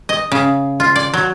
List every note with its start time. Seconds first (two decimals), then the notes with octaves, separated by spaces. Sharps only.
0.09 D#5
0.32 C#3
0.80 F4
0.96 D5
1.14 F#3